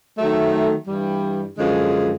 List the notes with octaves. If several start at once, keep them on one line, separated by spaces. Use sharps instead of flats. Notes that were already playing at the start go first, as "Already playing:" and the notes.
D#3 F#3 A3
G2 E3 G3
F#2 D3 F3 G#3